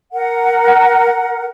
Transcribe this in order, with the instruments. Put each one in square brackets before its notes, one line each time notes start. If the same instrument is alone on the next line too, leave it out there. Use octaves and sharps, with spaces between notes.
[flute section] A#4 F#5